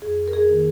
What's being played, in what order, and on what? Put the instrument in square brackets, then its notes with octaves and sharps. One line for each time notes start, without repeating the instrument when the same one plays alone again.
[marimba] F2 G#4
A#4
G#4
D#3 A#3 D#4